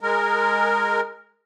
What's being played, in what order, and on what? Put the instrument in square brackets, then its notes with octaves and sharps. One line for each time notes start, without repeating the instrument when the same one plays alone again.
[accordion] G#3 A#4